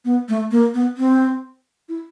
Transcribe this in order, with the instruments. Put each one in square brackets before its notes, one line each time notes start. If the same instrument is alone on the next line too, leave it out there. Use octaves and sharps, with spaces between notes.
[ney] B3
A3
A#3
B3
C4
E4